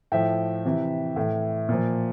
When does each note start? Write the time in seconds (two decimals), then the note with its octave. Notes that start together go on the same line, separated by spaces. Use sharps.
0.12 A2 F3 E5 G5
0.65 C3 E3
1.16 A2 E3
1.69 A#2 F3